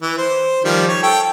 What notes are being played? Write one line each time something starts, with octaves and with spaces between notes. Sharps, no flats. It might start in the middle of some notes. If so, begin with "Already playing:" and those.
E3
C5
D#3 F3 G3
C#5
A4 G5